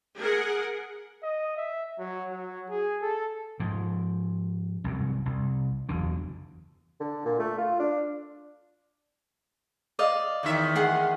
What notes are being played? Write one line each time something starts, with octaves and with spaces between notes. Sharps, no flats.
G#4 A#4 F#5
D#5
E5
F#3
F#3
G#4
A4
G#2 F3
C2 F#2
C2
F#1 E2 D3
D3
A#2
A3
F4
D4
D5 D#5 F5
E2 D#3 E5
G#4 F#5 C6